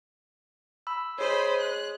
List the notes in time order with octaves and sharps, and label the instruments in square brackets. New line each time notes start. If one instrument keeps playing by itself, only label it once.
[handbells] B5 E6
[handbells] G#4 C#5 [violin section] C5 D#5 B5
[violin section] F#6